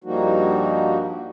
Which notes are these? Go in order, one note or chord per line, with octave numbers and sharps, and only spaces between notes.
G2 F3 G3 A#3 D#4 F#4